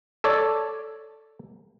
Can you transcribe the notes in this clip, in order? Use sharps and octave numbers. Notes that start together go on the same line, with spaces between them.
A4 C#5 D5